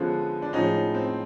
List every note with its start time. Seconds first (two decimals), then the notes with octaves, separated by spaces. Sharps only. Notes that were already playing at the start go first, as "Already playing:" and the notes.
Already playing: D3 F3 G#3 B3 C#4
0.42 D4
0.53 A2 F3 G#3 C#4 D#4
0.95 C4